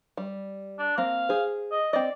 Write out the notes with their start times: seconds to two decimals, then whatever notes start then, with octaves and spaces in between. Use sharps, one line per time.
0.17 G3
0.79 D4
0.98 A#3 C4 F5
1.29 G#4 C5
1.72 D#5
1.93 C4 D5 D#5